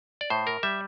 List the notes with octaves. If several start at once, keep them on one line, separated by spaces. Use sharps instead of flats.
D5
A2 C5
A#4
G3 E5